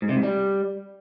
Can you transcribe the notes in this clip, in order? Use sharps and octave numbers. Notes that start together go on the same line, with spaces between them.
G#2
C3
G#2
G3